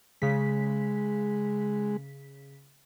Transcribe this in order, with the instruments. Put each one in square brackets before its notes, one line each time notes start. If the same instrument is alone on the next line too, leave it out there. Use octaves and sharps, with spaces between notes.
[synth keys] C#3 B6 [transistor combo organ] G#3